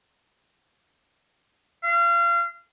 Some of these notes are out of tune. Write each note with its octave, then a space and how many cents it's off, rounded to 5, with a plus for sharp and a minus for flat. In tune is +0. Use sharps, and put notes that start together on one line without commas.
F5 -30